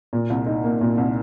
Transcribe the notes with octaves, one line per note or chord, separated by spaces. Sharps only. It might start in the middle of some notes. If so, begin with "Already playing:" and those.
A#2
C2
D#4
A#3
A#2
C2